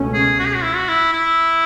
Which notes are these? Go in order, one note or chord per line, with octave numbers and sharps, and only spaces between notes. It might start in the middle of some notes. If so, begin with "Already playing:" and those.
Already playing: C#2 B2 A3 C#4
G#4
F#4
G#4
F#4
E4
F#4
E4
E4